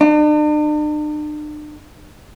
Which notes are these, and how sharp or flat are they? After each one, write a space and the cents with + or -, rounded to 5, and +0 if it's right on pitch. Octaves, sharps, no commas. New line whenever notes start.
D4 +45